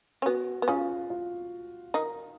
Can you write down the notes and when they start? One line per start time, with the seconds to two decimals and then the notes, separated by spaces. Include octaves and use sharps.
0.22 C#4
0.26 B3 F#4
0.62 B3
0.68 C#3 C#4 F4
1.10 F4
1.94 D#3 D#4